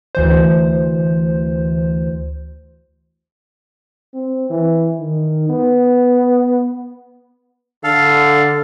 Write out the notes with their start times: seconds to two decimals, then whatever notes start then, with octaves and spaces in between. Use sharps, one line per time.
0.15 D2 E3 C5
4.14 C4
4.50 E3
4.99 D#3
5.50 B3
7.84 D3 A4 F5